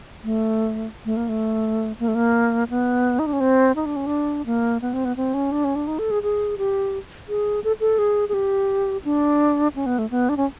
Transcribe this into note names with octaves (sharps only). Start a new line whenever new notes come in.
A3
A3
A#3
A3
A#3
A3
A#3
B3
D#4
D4
C#4
C4
D#4
D4
C#4
D4
A#3
B3
C4
B3
C4
C#4
D4
C#4
D4
D#4
A4
G#4
G#4
G4
G#4
A4
A4
G#4
G#4
G4
D4
C#4
B3
A3
B3
D4
C#4